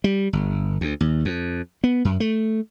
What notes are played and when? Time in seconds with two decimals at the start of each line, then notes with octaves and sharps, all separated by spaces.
0.04 G3
0.33 G1
0.81 D2
1.01 D#2
1.25 F2
1.84 B3
2.05 F#2
2.20 A3